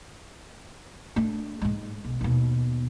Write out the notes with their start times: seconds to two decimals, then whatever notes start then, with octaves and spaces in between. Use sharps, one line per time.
1.16 A3 D4
1.62 G#2 G#3
2.04 B1
2.21 D#2 B2